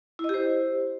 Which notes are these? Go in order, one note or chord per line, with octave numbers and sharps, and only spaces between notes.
E4
D#5
G4
C5